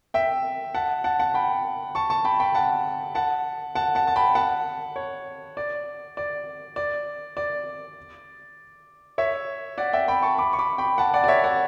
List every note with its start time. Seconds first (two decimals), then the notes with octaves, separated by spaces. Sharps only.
0.14 E5 G5
0.74 F#5 A5
1.04 F#5 A5
1.20 F#5 A5
1.34 G5 B5
1.95 A5 C#6
2.10 A5 C#6
2.25 G5 B5
2.40 G5 B5
2.54 F#5 A5
3.15 F#5 A5
3.75 F#5 A5
3.95 F#5 A5
4.07 A5
4.16 G5 B5
4.35 F#5 A5
4.96 C#5
5.57 D5
6.17 D5
6.76 D5
7.37 D5
9.18 C#5 E5
9.78 D5 F#5
9.93 E5 G5
10.08 G5 B5
10.23 A5 C#6
10.38 B5 D6
10.53 C#6
10.59 B5 D6
10.78 G5 B5
10.98 F#5 A5
11.14 D5 F#5
11.24 D5
11.28 C#5 E5
11.44 D5 F#5